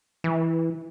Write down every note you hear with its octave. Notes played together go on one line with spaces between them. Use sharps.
E3